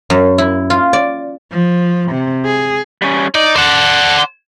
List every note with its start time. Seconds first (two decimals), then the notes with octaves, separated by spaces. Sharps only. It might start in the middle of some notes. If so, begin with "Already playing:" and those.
0.10 F#2
0.38 E4
0.70 F4
0.93 D5
1.52 F3
2.12 C3
2.46 G#4
3.02 G3 C#4
3.35 D#4 D5
3.56 A4 C5 D5 F#5